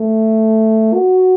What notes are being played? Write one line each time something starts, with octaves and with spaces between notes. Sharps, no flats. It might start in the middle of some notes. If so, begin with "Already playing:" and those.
Already playing: A3
F#4